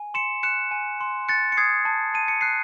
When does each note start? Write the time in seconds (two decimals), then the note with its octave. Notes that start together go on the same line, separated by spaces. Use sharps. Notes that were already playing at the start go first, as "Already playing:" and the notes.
Already playing: G#5
0.14 C6 C#7 E7
0.43 F#6 C#7 E7
0.71 G#5
1.01 C6
1.28 F#6 A6 C#7
1.52 C#7
1.57 D#6 G#6 C7
1.85 A5
2.14 A5 D#7
2.28 C#7
2.41 F#6 C7